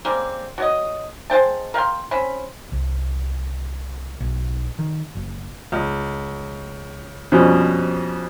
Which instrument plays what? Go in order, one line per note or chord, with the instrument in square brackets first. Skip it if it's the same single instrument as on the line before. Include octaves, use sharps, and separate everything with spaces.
[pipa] C#3 G3 A#3 C4
F#4 C#5 D#5
G#3 C5 G5 A5
A#4 F5 G5 C6
C4 C#4 B5
[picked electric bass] C2
B1
D#3
F#1
[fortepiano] C#2
F2 B2 G3 C4 C#4